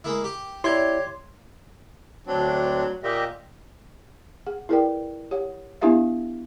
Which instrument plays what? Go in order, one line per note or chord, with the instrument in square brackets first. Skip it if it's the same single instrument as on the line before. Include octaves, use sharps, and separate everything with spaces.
[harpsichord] G#3 A#3 E4
G4
[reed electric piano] E4 D5 [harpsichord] G4 [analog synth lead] C#5 [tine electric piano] C6 G#6
[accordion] D2 C4 D4 [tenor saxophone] F#3
[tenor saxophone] A#2 [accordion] G4 D#5 E5
[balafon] G#4 F#5
E4 G#4 A#4 B4 D5 G5
G4 C#5 F#5
B3 D4 E4 G4 E5 F5